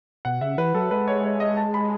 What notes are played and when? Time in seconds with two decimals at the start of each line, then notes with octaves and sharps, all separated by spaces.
0.25 B2 F#5
0.41 C#3 E5
0.58 E3 B4
0.75 F#3 A4
0.91 G#3 B4
1.08 C#5
1.24 C#5
1.40 D#5
1.57 A5
1.74 B5